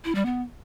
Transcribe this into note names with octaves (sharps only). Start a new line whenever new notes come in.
E4
G3
B3